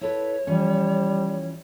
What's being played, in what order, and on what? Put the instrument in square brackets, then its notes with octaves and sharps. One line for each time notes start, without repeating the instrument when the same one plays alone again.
[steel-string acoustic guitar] E4 A4 B4 [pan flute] C#5
[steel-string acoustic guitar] E3 F3 C#4 [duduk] G3